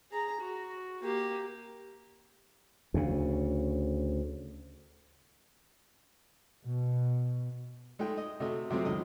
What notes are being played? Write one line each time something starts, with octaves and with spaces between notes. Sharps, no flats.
G#4 A#5
F#4
A#3 G4
D2 C#3
B2
G#3 A3 D#4 G5
D#5
C3 A3 F#4 D#5
C3 F3 F#3 G#3 A3 C4
C#2 D#3 D#5